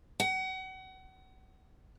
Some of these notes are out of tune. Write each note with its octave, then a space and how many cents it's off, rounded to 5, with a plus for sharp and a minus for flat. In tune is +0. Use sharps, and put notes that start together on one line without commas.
F#5 +35